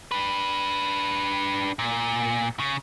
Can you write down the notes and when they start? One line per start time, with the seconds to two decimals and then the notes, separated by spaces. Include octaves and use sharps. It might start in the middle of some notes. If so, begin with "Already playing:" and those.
0.11 D4 B4
1.79 A#2
2.59 C#3